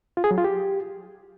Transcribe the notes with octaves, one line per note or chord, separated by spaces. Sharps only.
F4
G#4
F#3
F4
G4